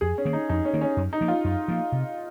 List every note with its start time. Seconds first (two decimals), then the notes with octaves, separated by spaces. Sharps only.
0.01 F2 G#4
0.18 C#4
0.25 D#3 A#3
0.33 D#4
0.49 F2 D#4
0.65 C#4
0.73 D#3 A#3
0.81 C#4
0.97 F#2
1.13 D#4
1.21 F3 A#3
1.28 F4
1.44 F#2
1.68 F3 A#3
1.92 C3